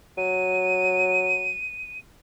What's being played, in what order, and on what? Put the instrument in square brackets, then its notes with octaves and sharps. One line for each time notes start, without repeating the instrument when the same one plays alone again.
[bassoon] F#3 [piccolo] D#7